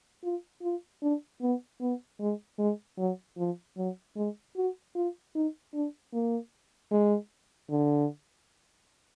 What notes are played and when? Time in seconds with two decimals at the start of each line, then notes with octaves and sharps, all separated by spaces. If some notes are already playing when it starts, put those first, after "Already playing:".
0.23 F4
0.62 F4
1.02 D4
1.42 B3
1.81 B3
2.20 G#3
2.59 G#3
2.98 F#3
3.38 F3
3.77 F#3
4.16 G#3
4.56 F#4
4.95 F4
5.35 D#4
5.73 D4
6.13 A#3
6.91 G#3
7.70 D3